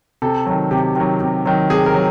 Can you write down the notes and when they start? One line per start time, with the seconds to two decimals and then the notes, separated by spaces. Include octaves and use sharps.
0.22 C3 A4
0.46 D#3 F#3
0.71 C3 G4
0.96 D#3 F#3
1.21 C3
1.45 D#3 F#3
1.70 C3 G#4
1.86 A#4
1.94 F#3